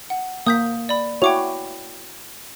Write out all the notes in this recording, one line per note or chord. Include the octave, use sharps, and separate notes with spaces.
F#5
A#3 D#6 G6 B6
D5 B5
E4 F#4 C#5 G5 D6 F7